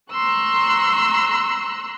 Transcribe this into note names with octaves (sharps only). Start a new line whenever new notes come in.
A#5 C6 C#6 E6 F#6